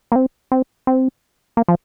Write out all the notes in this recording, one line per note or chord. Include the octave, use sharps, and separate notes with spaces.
A#3
C4
C4
C4
A#3
F3